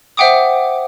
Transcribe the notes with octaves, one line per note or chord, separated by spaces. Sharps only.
C5 E5 F#5 G5 D6 D#6